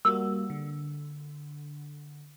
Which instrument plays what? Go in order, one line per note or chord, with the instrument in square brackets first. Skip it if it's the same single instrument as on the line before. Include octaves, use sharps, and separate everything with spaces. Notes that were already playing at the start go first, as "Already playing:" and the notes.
[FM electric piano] G3 A#3 F#4 [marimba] E6
[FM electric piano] D3